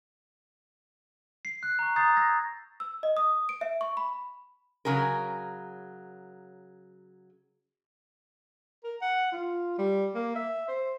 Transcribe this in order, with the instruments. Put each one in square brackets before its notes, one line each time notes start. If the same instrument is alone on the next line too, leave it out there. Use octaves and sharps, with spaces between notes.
[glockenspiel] C7
F#6
A#5 C#6
A#5 D#6 G6 A6 C7
E6 G#6 A#6
[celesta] E6
D#5
D#6
D7
E5
C#6
B5
[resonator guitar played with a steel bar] C#3 F#3 G#4 A#4
[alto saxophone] A#4
F#5
F4
G3
A#3
E5
C5